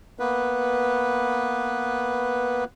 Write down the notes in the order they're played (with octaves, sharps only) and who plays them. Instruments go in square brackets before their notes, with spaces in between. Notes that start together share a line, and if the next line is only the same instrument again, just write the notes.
[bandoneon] A#3 B3 B4